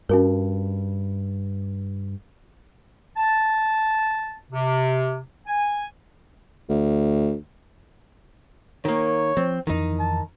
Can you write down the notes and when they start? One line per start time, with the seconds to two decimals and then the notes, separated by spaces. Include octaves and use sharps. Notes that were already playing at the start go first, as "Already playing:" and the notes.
0.09 G2 C#4 F#4 A#4
3.17 A5
4.51 C3
5.47 G#5
6.69 D2
8.85 D#3 A#3 C#5
9.37 F3 C4
9.67 F2 D#3 E3 D#4
9.99 A5